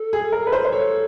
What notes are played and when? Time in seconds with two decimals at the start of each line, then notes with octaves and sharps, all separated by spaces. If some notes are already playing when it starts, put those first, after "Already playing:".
Already playing: A4
0.13 G#4
0.32 A#4
0.47 B4
0.52 C5
0.65 C5
0.72 A4 C#5